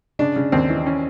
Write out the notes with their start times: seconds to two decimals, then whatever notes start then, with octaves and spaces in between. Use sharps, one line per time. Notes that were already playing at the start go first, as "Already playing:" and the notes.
0.19 C#3 D4
0.36 C#3
0.52 D#2 C4
0.70 E3
0.86 C#4